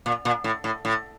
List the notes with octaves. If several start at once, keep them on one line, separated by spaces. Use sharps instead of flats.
A#2
A#2
A2
A2
A2